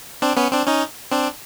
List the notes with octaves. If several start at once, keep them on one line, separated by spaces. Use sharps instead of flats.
C4 D4
B3 C#4
C4 D4
C#4 D#4
C4 D4